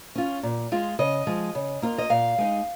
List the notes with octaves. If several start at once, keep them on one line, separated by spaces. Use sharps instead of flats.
C#4 F4
A#2
G#3 F4
C#3 D#5
F3 G#3
C#3
A#3 F4
D#5
A#2 F5
G#3 D#4